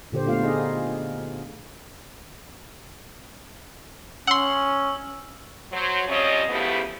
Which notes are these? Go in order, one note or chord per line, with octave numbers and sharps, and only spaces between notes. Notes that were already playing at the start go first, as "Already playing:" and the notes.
A#2 D3 G4 C5
A3 B3 F4 F5
D#4 G#4 D#5
C#4 F#5 C6 E6 F#7
F#3 C5
F3 G3 C4 C#4 C#5 D#5
C#3 F3 A3 B3 E4 G4